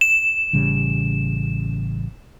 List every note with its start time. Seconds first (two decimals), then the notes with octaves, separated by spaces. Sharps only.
0.01 E7
0.53 A1 C#3 G3